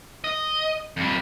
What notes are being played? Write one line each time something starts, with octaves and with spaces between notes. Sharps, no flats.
D#5
F2 G3